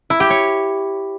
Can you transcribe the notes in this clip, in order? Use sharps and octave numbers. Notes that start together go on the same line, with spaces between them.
E4
G4
C#5